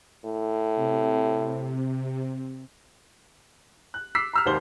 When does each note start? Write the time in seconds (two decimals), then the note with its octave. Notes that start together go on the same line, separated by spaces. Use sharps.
0.25 A2
0.76 C3
3.94 F#6
4.15 D6 E6 B6 C7
4.33 A#5 E6 F6
4.46 G#1 D#2 C5 G7